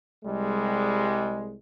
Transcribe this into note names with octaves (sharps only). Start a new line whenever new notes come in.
C2 G3 G#3